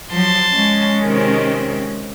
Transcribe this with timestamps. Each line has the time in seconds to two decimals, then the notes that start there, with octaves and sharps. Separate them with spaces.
0.11 F3 F#3 A5 C6
0.53 G#3 C#4
1.03 C3 D#3 C4